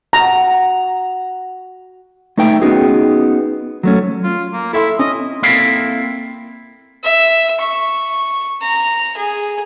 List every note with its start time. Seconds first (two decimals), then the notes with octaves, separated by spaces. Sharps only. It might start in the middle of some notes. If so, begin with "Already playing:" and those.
0.13 F#4 A#5
2.37 A3 D#4 B4 E5 G5
2.62 B3 C#4 D#4 F#4 G#4
3.83 F#3 A3 C#4
4.24 F4
4.53 A#3
4.73 E4 A4 E5 C6
4.99 C#4 D#5
5.43 A#3 C4 E4 A4 A#4 F5
7.04 E5
7.61 C#6
8.62 A#5
9.17 G#4